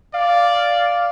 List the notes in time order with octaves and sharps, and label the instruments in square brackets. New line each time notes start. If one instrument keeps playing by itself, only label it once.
[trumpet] D5 [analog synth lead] F5